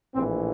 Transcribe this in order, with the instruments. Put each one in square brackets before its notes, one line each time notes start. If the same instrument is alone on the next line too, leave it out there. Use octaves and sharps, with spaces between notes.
[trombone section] A#1 A2 E3 C4